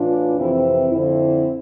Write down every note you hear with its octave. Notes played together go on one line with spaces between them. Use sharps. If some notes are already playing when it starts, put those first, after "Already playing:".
Already playing: A2 E3 D4 F4
F2 C3 E3 C4 E4
F2 D3 C4 E4